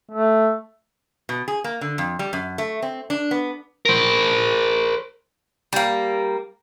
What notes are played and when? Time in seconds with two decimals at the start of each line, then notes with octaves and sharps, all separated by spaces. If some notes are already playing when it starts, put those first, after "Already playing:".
0.12 A3
1.29 B2
1.48 G#4
1.64 A#3
1.81 D3
1.98 F2
2.19 G3
2.33 F#2
2.58 A3
2.82 C4
3.10 D4
3.31 B3
3.85 A#4 C5
5.73 G3 A#3